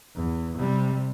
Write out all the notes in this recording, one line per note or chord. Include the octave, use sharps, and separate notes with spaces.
E2
C3 G3